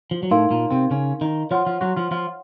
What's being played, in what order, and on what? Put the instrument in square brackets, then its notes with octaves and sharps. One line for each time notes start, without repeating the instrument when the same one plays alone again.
[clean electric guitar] F3
F#3
[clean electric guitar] A2 A3 [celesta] D#4 A#4 F5 C6
[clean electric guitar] A#2 A#3
C3 C4
C#3 C#4
D#3 D#4
[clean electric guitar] F3 F4 [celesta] C#5 F#5 C6
[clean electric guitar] F3 F4
F#3 F#4
F3 F4
F3 F4